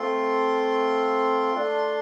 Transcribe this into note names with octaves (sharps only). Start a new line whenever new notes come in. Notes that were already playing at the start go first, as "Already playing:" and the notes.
Already playing: A3 C4 F4 C6
A3 D4 F4